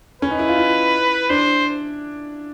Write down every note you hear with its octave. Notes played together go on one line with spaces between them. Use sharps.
C#4 B4
D#4
E4
F4
E4
D4 C5